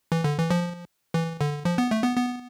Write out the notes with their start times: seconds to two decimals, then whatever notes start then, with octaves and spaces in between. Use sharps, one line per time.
0.12 E3
0.24 D3
0.38 E3
0.51 F3
1.14 E3
1.41 D3
1.65 F3
1.78 B3
1.91 A3
2.04 B3
2.17 B3